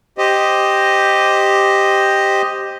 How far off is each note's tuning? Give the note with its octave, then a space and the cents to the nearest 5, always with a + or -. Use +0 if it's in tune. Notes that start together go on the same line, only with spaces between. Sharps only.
G4 +0 C5 +0 D#5 +0